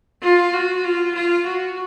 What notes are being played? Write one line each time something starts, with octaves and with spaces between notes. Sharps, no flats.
F4
F#4
F4
F4
F#4